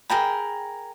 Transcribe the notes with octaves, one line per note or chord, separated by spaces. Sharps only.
G#4 A#4 G5 B5